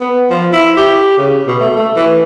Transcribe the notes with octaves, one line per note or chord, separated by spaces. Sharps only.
B3
F3
E4
G4
C#3
B2
A3
A3
E3